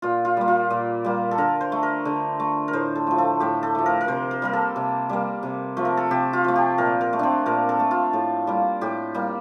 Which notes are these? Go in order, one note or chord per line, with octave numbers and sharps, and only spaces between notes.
A#2 F4
F4
G3 A#3
F4
A#2
G3 A#3
A4
D3 A#4
C5
A3
A#4
D3
A3
A#4
A2 C5
A4
F3 A3
A4
A2 G4
A4
F3 A3
A#4
A#4
C3 C5
A#4
G3 A#3 A#4
A4
C3
G3 A#3
C3
F3 A3
A#4
A4
C3 G4
F4
F3 A3
G4
A#2 A#4
A#4
A3
C4 D4
A#2 A#4
A4
A3
F4
A2
G3 A#3
A2 G4
G3 A#3